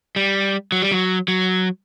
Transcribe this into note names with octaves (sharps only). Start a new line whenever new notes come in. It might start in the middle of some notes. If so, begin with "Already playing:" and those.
G3
F#3
G3
F#3
F#3